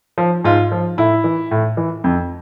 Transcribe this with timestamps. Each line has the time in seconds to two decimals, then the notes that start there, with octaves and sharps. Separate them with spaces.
0.18 F3
0.44 G#2 F4
0.72 F3
0.98 A2 E4
1.24 E3
1.51 A2
1.77 E3
2.04 F2